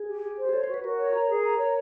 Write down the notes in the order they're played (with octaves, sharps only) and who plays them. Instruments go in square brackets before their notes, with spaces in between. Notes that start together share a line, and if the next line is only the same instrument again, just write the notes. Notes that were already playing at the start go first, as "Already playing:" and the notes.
Already playing: [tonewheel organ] G#4
[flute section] G4
G4
C5
[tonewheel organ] G#4
[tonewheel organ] A4 [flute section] C#5
[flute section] F#4 [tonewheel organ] C5
[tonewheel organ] B4
[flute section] F#4 [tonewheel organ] A#4
[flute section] C#5
A#5
G#4
A#5
C#5